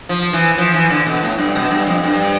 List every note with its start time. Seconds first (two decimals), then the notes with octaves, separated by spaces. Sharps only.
0.09 F3
0.33 E3
0.58 F3
0.74 E3
0.90 D3
1.07 B2
1.22 A2
1.39 G2
1.55 B2
1.71 G2
1.87 F2
2.04 G2